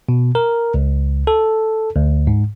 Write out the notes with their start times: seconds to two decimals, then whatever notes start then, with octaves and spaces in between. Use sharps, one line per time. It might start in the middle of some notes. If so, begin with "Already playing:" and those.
0.09 B2
0.35 A#4
0.74 C#2
1.27 A4
1.96 D2
2.27 G#2